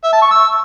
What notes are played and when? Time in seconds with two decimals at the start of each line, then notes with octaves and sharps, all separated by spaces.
0.04 E5
0.13 A5
0.22 C#6
0.31 E6